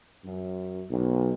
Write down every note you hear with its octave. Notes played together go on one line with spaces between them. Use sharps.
F#2
B1